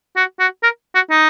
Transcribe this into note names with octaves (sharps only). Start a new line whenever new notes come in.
F#4
F#4
A#4
F#4
D#4